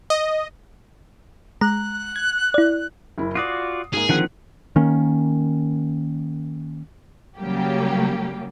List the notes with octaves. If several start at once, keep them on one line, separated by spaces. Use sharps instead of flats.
D#5
G#3 A#5 F#6
G#6
E4 D5
F#1 E4
F4 F#4 D5 D6 D#6 C7
G#2 A#3 G#4
D3 D#3 F3 A#3 C4 F#5
D#3 A#3 C#4
C#3 F#3 G3 A#3 G4